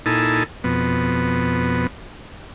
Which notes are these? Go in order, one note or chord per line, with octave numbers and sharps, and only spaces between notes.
A#2 D#4 E4 A4 G#5 A5
F2 B2 B3